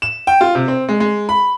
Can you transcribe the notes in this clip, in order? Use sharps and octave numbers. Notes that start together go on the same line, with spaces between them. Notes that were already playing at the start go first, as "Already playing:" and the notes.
E7
G5
F4
C3
C4
G#3
G#3
B5